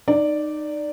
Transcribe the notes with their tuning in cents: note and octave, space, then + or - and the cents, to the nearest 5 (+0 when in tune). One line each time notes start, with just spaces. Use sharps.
D#4 -25 D5 +0